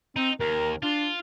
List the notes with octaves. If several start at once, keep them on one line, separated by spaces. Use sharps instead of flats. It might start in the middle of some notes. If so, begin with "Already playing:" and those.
C4 D#4
D#2 A#4
D4 F4